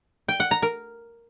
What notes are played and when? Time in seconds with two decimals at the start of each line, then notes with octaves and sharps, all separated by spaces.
0.28 G5
0.40 F#5
0.51 A#5
0.62 A#4